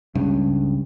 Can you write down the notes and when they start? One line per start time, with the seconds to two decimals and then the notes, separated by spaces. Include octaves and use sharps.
0.15 C#2 G2 C#3